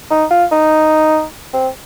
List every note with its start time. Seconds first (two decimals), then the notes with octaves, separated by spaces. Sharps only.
0.11 D#4
0.31 F4
0.52 D#4
1.54 C4